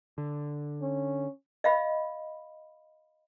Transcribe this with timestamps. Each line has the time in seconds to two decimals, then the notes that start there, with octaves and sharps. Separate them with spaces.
0.18 D3
0.82 C#4
1.64 D#5 F5 B5